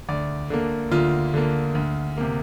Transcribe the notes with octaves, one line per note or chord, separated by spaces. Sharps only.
D2 D5
D3 A#3
D2 F4
D3 A#3
D2
C3 A#3